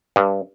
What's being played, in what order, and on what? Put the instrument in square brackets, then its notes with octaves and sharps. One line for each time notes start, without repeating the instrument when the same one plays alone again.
[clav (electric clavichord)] G2